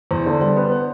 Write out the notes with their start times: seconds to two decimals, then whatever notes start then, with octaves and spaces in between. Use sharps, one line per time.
0.11 E2 C5
0.26 D3 D5
0.41 G3 C5
0.56 B3 B4
0.72 C5